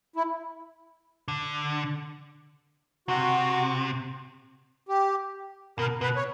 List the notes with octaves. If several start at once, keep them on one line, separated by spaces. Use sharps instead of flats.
E4
D3
C3 F#4
G4
B2 A#4
B2 B4
C#5